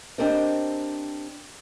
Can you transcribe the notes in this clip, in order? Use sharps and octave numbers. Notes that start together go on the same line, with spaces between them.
C4 D4 G4 A#4 C5 D#5